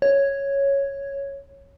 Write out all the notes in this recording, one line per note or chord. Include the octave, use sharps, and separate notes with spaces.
C#5